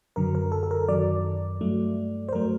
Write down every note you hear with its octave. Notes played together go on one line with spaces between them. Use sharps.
F#2 D3 F#3 A#4
A#4
A4
A4
A#4
F#2 D#3 F#3 D5
G2 F#3 A3
C5
G2 F#3 A3 A#4